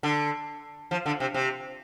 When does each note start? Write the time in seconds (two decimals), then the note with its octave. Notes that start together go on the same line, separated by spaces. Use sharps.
0.03 D3
0.91 F3
1.06 D3
1.20 C3
1.34 C3